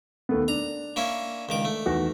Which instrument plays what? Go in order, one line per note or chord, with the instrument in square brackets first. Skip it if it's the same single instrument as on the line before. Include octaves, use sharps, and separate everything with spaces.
[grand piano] D#2 A3 B3
[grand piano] D4 [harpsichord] A#5
[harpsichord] A#3 C#4 E4
C#2 D#3 D6
A3
[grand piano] E2 D#3 F#4